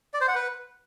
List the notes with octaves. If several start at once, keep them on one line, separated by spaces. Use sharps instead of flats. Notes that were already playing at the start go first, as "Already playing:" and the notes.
D5
C5
F#5
B4